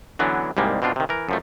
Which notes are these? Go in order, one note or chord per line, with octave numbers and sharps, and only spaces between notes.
D3 E3 F#3 B3 C#4 D4
C2 G#2 G3 G#3 A#3
B2 C4 D4 F4
C3 D#3
E3 A#4
F#2 F3 A3